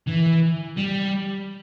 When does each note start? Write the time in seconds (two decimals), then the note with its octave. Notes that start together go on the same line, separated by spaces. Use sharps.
0.07 E3
0.78 G3